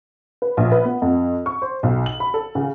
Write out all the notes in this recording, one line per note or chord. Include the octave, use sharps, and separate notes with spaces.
B4
A#1
B4
B3
F2
C#6
C5
B1
F#7
B5
A4
C#3